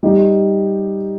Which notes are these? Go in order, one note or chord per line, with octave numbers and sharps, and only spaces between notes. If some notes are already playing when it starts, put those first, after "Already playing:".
G3 D#4 G4